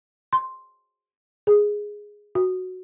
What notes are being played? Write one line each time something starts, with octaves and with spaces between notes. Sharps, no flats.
C6
G#4
F#4